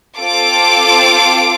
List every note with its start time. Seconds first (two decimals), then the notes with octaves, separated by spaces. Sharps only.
0.19 C4 F4 A4 D6